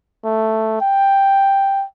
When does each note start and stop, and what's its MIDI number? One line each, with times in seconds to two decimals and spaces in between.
0.25 0.77 57
0.81 1.85 79